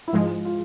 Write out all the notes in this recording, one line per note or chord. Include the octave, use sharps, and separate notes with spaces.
E4
G#2 F3 G#3 F4
F4